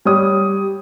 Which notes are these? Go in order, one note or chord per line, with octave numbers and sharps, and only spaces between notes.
G3 C#5 D#6